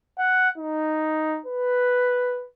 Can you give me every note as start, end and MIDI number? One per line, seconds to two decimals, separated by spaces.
0.18 0.49 78
0.58 1.40 63
1.46 2.46 71